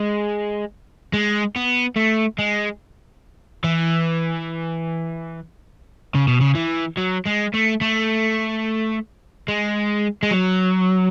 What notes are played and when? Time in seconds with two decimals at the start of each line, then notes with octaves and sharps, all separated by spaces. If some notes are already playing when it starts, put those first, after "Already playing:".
Already playing: G#3
1.13 G#3
1.56 B3
1.96 A3
2.39 G#3
3.64 E3
6.15 C#3
6.28 B2
6.41 C#3
6.55 E3
6.97 F#3
7.26 G#3
7.54 A3
7.81 A3
9.48 G#3
10.23 G#3
10.31 F#3